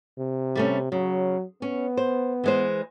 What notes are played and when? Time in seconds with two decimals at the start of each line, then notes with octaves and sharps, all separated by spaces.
0.18 C3
0.55 G3 A3 C#4
0.92 C#3 F#3
1.62 B3 C#4
1.97 C5
2.44 E3 G#3 C5